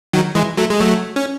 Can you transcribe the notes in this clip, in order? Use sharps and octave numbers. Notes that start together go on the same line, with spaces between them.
D#3 F#3
E3 G#3
F#3 A3
G#3
F#3 A3
C#4